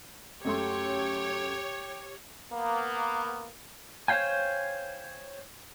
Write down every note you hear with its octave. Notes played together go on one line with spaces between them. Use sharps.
F#2 A3 G4 C#5 C6
A#3 B3
C5 C#5 D#5 F5 G5 G#5